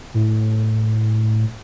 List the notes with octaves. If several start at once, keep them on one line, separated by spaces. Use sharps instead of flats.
A2